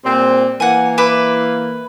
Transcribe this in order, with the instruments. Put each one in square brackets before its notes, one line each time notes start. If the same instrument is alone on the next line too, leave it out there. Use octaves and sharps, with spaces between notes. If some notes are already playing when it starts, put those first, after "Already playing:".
[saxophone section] A#2 G3 C4
[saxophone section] E3 A#3 [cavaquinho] F#5 G#5
[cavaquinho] B4 E5 D6